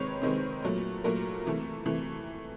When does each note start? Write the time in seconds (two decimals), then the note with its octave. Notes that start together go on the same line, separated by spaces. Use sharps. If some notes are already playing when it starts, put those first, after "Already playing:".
Already playing: C3 D#3 G#3 C4 B4 C#5
0.22 C3 D#3 G#3 C4
0.63 A#2 F#3 A3
1.04 A#2 F#3 A3 A#4
1.45 C3 E3 A3
1.86 C3 E3 A3